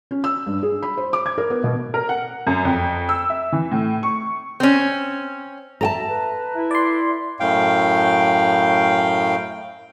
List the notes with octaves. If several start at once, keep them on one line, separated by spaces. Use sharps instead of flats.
C#4
E6
G2
G#4
B5
C5
D6
G#6
A#4
B3
B2
A#4
F#5
F#2
F2
E6
E5
E3
A2
C#6
C4 C#4
A4 E5 G5 A5 A#5
B4
E4
D5 C6
F#2 A2 F5 G5